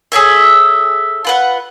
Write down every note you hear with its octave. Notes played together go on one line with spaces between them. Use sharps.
G#4 A4 C#5 E5
F4 B4 F#5